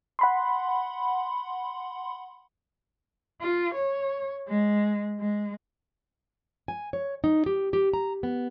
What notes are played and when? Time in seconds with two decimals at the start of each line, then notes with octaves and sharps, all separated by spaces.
0.19 F#5 B5 C6
3.41 F4
3.75 C#5
4.49 G#3
5.19 G#3
6.68 G#5
6.93 C#5
7.24 D#4
7.46 G4
7.73 G4
7.93 A#5
8.23 B3